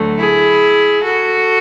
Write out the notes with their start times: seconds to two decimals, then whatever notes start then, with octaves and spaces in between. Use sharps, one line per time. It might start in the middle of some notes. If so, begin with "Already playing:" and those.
Already playing: D2 D3 F#3 A3
0.18 E4 G#4
1.04 F#4 A4